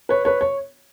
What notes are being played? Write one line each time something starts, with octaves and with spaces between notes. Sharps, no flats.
B4 C#5
B4 C#5
C#5